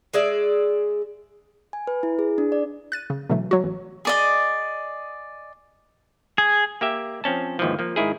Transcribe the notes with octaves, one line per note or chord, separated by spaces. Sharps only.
G#3 G#4 D5 E5
G#5
B4
E4
G#4
D4
D5
F#6 A6 D#7
C#3
B2 D3 E3 F#3 A3
F#3 F#4
A1
G#4 D5 D#5
G#4
A#3 G4 E5
F3 C4 C#4 A5
G#1 D#2 E3 F3
F3 A#3
G#2 D#3 E4 G#4